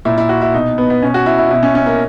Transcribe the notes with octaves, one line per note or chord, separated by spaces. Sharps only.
A#2 E4
E4
F#4
E4
B2 D#4
B3
B3
B2 C#4
F#4
E4
E4
B2 E4
C#4
C#4
A#3